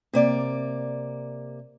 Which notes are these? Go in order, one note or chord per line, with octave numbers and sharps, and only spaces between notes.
C3 A#3 D5